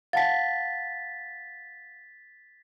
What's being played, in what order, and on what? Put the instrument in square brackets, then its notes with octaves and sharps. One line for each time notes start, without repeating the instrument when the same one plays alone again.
[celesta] F5 F#5 A5 [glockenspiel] A6 B6